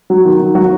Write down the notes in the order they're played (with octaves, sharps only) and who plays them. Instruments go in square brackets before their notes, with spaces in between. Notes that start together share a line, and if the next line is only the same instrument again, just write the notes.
[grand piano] F#3
D#3
D#3
F#3 F#4